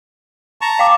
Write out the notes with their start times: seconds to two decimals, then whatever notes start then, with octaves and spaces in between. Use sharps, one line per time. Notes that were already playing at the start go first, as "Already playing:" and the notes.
0.61 A5 A#5 C#6
0.79 F5 G5 D6